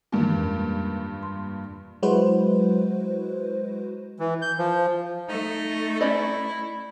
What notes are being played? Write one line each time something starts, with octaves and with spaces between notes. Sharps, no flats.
G2 A#2 D#3 E3 G#3
F2 C#4
C6
F#3 G#3 E4 F#4 B4 C5
E3
G6
F3
A3 D#4
C#4 E4 D5 D#5